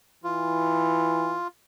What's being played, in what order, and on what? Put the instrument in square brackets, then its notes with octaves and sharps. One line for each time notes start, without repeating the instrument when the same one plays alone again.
[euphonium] E3 [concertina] F4